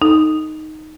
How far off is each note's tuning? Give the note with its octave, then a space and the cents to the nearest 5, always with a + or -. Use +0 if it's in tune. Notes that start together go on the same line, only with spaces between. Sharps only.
D#4 +0 A4 +0